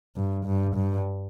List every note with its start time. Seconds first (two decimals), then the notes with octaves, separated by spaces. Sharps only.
0.16 G2
0.46 G2
0.76 G2